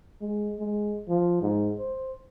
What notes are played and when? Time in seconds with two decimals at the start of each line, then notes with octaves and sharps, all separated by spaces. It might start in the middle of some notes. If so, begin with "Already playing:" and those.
0.21 G#3
0.59 G#3
1.09 F3
1.42 G#2
1.79 C5